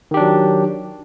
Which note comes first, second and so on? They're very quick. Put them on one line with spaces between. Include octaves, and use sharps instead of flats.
D#3 G4 D4 F#3